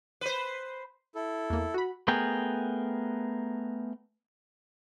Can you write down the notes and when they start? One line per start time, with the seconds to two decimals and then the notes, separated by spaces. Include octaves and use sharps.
0.21 B4 C5
1.15 E4 A4
1.50 E2 A#3
1.74 F#4 B5
2.08 A3 B3 G#4 A#4 G5